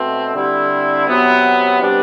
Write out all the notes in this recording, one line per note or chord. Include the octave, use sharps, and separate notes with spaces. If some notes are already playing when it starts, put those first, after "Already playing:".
Already playing: B2 A3 C4
D3 G3 C4 E4
C3 F#3 B3
C3 G3 B3 D4